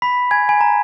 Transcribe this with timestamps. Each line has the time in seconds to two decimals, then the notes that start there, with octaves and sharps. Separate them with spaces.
0.02 B5 B6
0.31 G#5 G#6
0.49 G#5
0.61 A#5